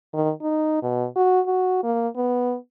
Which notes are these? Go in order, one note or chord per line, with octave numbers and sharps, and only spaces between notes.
D#3
D#4
B2
F#4
F#4
A#3
B3